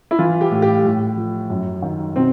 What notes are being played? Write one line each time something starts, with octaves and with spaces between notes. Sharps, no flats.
E4
E3 F4
G4
A2
G4
A2
F3
F#2
D#3
B2 C4